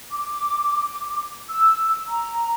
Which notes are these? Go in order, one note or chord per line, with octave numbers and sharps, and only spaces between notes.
D6
E6
A#5